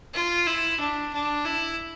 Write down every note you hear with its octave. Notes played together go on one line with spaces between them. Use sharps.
F4
E4
D4
D4
E4